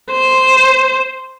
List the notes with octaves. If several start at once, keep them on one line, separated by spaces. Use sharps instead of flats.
C5